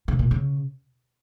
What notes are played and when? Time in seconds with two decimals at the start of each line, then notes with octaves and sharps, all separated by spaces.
0.08 C#3
0.19 A#2
0.31 C#3